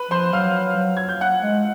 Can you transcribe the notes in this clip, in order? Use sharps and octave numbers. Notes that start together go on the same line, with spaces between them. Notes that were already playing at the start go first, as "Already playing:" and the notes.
Already playing: B4 B5
F3 C5 C6
F#3 F5 F6
F#3
G#6
G6
F#5 F#6
G#3